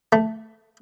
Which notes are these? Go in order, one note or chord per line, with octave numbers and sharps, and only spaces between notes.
A3